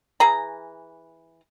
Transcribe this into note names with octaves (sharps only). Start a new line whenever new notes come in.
E3 G#4 A#5